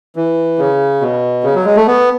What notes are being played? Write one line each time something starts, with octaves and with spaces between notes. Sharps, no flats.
E3
C#3
B2
C#3
F#3
G#3
A3
B3